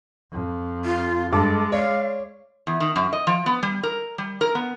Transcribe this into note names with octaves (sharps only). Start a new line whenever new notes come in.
F2
F4
G2 G#3 A4 D6
C#5 D5 F5
E2
D#3
F#2
D#5
F3
B3
G3
A#4
G3
A#4
B3